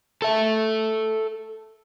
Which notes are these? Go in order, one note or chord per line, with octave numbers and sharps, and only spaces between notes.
A4 E5